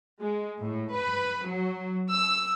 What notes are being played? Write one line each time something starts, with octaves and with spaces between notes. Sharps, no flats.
G#3
A2
B4
F#3
E6